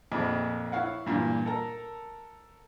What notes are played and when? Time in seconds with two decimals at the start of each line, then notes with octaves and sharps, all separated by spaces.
0.12 A#1 F2 A#2 F3 B5
0.72 E4 C#5 F5 F#5
1.06 G2 A#2 E3
1.46 A4 A#4 A#5